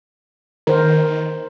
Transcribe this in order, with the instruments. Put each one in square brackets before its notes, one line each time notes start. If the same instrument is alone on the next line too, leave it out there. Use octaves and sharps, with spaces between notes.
[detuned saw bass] D#3 [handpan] A#4 C5